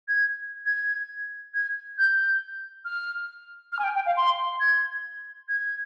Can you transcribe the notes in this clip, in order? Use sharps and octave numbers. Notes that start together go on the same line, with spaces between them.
G#6
G#6
G#6
G6
F6
F6
G#5
G5
G5
F5
C6
G#6
G#6